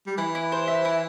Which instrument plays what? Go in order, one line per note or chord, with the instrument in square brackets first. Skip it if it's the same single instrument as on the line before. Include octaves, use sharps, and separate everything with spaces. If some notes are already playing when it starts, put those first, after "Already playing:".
[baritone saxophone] G3
[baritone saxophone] E3 [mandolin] E4
[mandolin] E4
C5
E5
E4